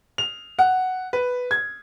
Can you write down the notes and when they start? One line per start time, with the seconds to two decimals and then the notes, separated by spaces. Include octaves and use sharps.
0.18 F7
0.59 F#5
1.13 B4
1.51 G#6